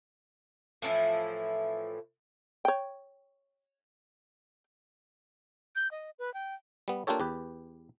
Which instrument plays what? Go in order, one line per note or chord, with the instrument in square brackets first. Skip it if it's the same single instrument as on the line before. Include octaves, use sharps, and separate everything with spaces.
[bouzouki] A2 E3 F3 E4
[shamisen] C#5 G5
[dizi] G6
D#5
B4
G5
[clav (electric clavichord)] G3 B3
A#3 D4 F4 G4 A4 C#5
E2 G4 B4